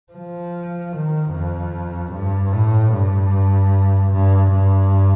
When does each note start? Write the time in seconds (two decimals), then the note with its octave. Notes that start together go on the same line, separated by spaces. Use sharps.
0.12 F3
0.93 D#3
1.32 F2
2.12 G2
2.53 A2
2.92 G2
4.12 G2
4.51 G2